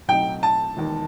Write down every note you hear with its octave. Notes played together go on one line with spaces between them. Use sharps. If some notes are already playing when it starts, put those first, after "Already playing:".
B1 A2 F#3 C4 D#4 G5
A5
E1 D#2 D#3